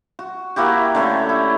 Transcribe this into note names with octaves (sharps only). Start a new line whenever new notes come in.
F#4
A#3 E4 F#4 G4
D3 A3 C#4 C#5
E4